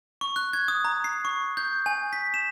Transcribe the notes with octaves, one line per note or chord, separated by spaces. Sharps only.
C#6
F#6
G#6
D#6
A#5
C7
C#6
G6
G#5
B6
E7